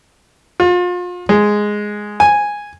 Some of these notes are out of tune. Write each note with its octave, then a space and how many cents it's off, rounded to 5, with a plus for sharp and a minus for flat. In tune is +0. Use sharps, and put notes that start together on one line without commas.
F4 +35
G#3 +0
G#5 -5